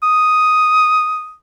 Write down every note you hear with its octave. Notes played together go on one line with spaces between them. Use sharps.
D#6